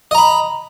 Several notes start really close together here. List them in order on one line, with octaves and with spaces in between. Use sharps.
D#5 A#5 B5